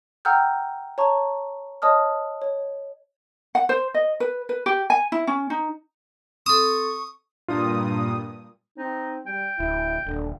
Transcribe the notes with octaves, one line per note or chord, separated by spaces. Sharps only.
F#5 G5 A#5 E6 F6 G6
C#5 A5 A#5 C#6
C#5 D#5 A5 D#6 F6
C#5
F#5
C5
D#5
B4
B4
G4
G#5
E4
C#4
D#4
C4 A4 C#6 D#6
G2 A#2 F4 D#6
C4 D#4
G3 G5
D1 E4
D#1 D3